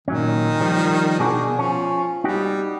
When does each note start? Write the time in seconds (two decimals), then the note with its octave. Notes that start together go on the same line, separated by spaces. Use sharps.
0.08 A#2 D#3 F#3 C#4
0.60 F3 G3
1.19 B2 D4 F#4 G#4
1.59 F3 C#4
2.24 G3 D#4 F#4 G4